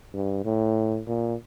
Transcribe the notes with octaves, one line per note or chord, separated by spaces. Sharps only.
G2
A2
A#2